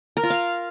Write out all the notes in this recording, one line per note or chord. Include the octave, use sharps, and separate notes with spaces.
A#4
F4
F5